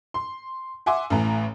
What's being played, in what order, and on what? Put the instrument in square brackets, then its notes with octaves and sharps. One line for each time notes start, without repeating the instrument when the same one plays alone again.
[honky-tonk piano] C6
E5 F#5 G#5 C6 D6
A1 A2 E3 A#5